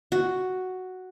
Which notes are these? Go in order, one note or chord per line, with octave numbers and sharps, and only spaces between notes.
F#4